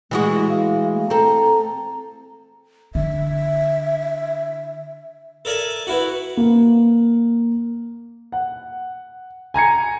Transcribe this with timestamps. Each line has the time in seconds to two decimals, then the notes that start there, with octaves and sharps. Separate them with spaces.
0.11 E3 G#3 A3 F#4
0.49 F5
0.94 A3
1.10 C4 A4 A#5
2.95 D3 E5
5.45 A4 A#4 D5 E5 G#5 A5
5.87 B3 E4 F#4
6.37 A#3
8.32 F#5
9.54 G#5 A#5 G#6 C#7